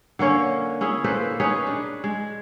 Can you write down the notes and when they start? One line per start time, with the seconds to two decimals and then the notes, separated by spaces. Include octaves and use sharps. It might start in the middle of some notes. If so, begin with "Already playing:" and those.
0.19 D3 A#3 C#4 C#5
0.81 C#4 E4 G#4
1.04 A#3 A4 B4 C5
1.40 C#4 D#4 G#4 B4
1.67 D4
2.04 G#3